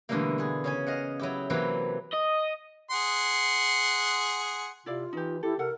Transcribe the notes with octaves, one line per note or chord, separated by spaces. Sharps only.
B2 D3 E3 G3 A3 A#3
B3 G#4
C#3 C#4 G#5
D#5 F5 F#5
F#3 E4 G4
C3 E3 F#3 A#3 C4 B4
D#5
G#4 F#5 C6
C3 E4 F4 D5 F5
E3 D#4 G4
E4 G4 A4
C3 A4 A#4 F#5